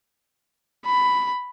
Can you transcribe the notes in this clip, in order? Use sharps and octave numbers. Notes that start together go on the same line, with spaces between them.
B5